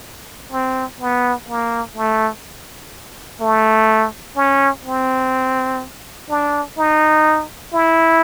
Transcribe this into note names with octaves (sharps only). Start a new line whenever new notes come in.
C4
B3
A#3
A3
A3
C#4
C4
D4
D#4
E4